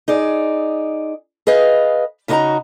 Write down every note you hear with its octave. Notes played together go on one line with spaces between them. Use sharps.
D#4 G#4 D5
G#4 B4 D#5 F5
C#3 D#4 F#4 C#5 D#5 A#5